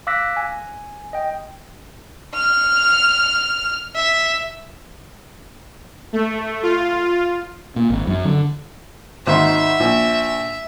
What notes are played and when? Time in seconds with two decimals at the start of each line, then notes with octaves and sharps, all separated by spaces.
0.07 F5 D6 E6 F#6 A#6 B6
0.36 G#5
1.13 D#5 G5
2.34 F6
3.95 E5
6.13 A3
6.63 F4
7.76 A#2
7.90 G#1
8.07 F#2
8.25 D3
9.27 G#1 D#3 E5 C6
9.80 A#1